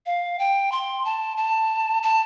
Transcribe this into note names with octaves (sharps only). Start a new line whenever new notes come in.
F5
G5
C6
A5
A5
A5